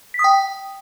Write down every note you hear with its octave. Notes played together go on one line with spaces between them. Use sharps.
B6
D#6
G5